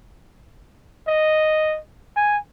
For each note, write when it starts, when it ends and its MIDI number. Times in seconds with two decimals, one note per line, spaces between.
1.08 1.79 75
2.16 2.38 80